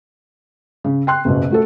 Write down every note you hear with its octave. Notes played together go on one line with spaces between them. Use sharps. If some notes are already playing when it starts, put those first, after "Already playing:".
C#3
G5 C6 F#6
F#1 B1 B2
A3 F#4 A4